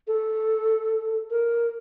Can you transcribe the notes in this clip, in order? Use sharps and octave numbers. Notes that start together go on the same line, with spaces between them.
A4
A#4